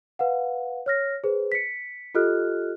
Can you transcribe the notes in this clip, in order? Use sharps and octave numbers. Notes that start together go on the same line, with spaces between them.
B4 F5 F#5
C#5 F6 A#6
G#4 B4 C5
B6 C#7
F4 G4 A4 D#5 F6 F#6